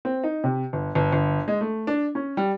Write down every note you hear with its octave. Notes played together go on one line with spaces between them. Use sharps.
C4
D#4
C3
G1
G1
G1
G#3
A3
D4
C#4
G3